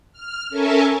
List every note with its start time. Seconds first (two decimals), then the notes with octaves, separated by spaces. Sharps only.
0.13 F6
0.50 C#4 A4 A#4 E5 G#5 A5